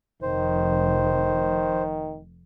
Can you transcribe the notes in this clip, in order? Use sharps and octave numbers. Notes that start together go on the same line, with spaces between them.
F1 D#3 C5